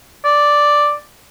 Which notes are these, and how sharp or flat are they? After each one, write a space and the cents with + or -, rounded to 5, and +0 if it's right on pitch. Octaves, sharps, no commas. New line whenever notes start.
D5 +0